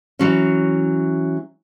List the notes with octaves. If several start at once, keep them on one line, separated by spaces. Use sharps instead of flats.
E3 F#3 C#4